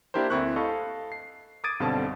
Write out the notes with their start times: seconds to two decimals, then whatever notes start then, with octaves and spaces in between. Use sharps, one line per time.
0.14 A#3 D4 E4 G4 A#4 C5
0.30 D2 C4 E4 C#6 F#6
0.56 A4 D#5 F5 B5 C#6
1.12 C7
1.64 D6 D#6 G#6 A6 D7 D#7
1.80 B1 G2 B2 D3 C4 A5